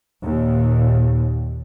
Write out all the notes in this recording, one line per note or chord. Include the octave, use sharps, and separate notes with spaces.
D#2 A#2